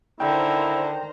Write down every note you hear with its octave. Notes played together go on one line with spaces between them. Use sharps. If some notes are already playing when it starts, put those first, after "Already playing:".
D3 D#3 E4 C5 G5 A#5